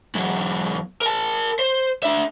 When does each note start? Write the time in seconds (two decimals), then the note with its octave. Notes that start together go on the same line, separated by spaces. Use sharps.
0.15 E2 F#3
1.01 A#4 A5
1.59 C5
2.03 D4 E5